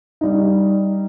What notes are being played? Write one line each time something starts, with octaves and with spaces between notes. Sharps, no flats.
G3 D#4